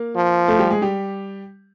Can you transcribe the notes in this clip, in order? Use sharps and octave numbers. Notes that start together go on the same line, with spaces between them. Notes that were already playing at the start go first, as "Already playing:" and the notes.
Already playing: A#3 A#4
F3
A3 A4
G3 G4
G#3 G#4
G3 G4